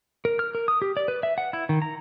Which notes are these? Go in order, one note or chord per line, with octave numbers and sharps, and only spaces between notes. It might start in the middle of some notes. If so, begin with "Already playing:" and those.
A#4
F6
A#4
D#6
G4
D5
B4
E5
F#5
E4
D#3
A#5